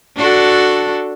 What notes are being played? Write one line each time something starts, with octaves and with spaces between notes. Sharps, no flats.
D4 F#4 A4